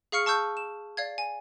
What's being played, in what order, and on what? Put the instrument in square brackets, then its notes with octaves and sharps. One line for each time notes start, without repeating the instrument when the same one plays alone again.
[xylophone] G#4 F5 C#6 F6 C#7
A5 C#6 E6 G6
E7
D5 F5 G#6
G#5